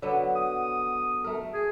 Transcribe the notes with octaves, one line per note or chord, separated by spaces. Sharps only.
D3 F#3 B3
D#6
A3 A#4
G#4